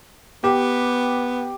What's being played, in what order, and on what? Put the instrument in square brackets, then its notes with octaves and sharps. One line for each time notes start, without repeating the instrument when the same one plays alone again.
[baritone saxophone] B3 [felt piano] G4